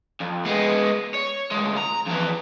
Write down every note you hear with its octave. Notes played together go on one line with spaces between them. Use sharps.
F2
G#3 B3
C#5
D2 G#3
A#5
F2 E3